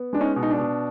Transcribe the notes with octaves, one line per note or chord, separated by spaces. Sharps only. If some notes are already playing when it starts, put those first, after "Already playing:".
Already playing: B3
G#3 D4
C#4 D#4
B2
D#4
D4
B2